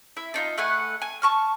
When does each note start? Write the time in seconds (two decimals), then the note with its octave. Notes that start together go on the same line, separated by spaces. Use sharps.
0.17 E4 E5
0.34 D4 D#4 F4
0.58 A3 B4 F#5 G#5
1.02 G#5
1.22 A5 C#6 F6